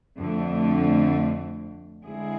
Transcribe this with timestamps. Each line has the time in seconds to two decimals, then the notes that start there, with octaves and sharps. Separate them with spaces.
0.19 F2 D3 A3
2.04 D3 G#3 C4 E4 G#4